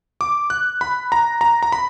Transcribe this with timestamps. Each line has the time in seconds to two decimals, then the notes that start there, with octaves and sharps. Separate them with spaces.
0.21 D6
0.50 F#6
0.81 B5
1.12 A#5
1.41 A#5
1.63 A#5
1.72 B5